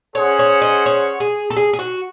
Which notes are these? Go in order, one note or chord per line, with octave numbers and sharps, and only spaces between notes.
C#4 G#4 C5 C#5 F#5
C#5
D#5
C#5
G#4
A4
G#4
G#4
F#4